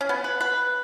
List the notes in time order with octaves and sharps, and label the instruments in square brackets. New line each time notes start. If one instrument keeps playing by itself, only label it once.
[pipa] C#4
B3
B4
B4